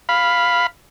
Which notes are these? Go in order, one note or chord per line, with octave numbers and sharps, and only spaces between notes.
F5 B5